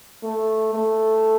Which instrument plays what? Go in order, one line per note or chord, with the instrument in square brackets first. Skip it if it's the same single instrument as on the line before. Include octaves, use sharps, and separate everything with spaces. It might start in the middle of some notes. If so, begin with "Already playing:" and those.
[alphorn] A3
A3